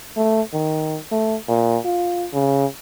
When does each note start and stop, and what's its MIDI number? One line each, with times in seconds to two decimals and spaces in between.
0.17 0.41 57
0.53 0.99 51
1.11 1.36 57
1.48 1.78 46
1.85 2.26 65
2.33 2.66 49